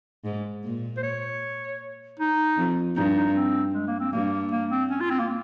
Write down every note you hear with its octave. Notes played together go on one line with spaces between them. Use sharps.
G#2
A#2
C5
C#5
D#4
F2
G2 D#4
D#4
C4
G#3
A#3
C4
G2 A#3
A#3
C4
C#4
F4
C4
A#3